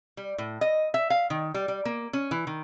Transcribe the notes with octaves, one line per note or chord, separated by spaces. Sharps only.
G3
A2
D#5
E5
F5
D#3
G3
G3
A#3
C#4
E3
D#3